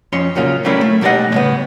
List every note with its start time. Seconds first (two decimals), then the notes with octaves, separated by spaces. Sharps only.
0.12 F2 C#4 C#5 C6
0.35 A#2 C#3 F#3 A#3 F4
0.65 F#3 G3 A3 A#3 C#4 E4
0.81 A3
1.01 B1 G3 A#4 D5 D#5 F#5
1.32 A2 C#3 B3